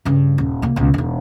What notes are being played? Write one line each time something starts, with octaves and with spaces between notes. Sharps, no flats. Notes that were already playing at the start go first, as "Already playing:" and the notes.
G2 C#3
D#1
C2 A#3
C#2 B2
E1 D#4